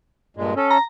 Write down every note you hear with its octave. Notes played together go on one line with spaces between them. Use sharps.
G2 A#2 G#3
C#4 A4
A#5